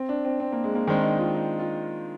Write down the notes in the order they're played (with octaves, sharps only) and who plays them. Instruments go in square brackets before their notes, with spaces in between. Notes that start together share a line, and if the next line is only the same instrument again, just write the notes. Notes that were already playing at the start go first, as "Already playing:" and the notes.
Already playing: [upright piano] C4
D4
C4
C4
A#3
G#3
A#3
[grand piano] D#3 G#3 C4 [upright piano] D4
[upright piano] D#4
F4
D#4
F4